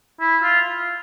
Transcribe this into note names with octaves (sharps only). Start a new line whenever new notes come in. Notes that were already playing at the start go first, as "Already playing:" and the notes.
E4
F4